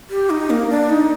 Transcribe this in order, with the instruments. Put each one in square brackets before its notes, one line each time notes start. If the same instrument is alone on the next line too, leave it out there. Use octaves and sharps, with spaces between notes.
[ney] G4
D#4
A#3
D4
D#4